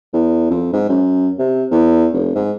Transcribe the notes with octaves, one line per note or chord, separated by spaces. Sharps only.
E2
F2
G#2
F#2
C3
E2
F1
G#2